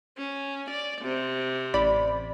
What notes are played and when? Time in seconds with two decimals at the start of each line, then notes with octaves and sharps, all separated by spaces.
0.17 C#4
0.70 D5
1.01 C3
1.74 A1 D5 B5